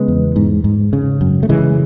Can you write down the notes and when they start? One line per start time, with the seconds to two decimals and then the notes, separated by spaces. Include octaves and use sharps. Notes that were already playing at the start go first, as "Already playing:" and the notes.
Already playing: C#3 G#3 B3
0.08 E2
0.36 G#2
0.64 G#2
0.93 C#3
1.21 F#2
1.43 A3
1.49 C#3 E3 G#3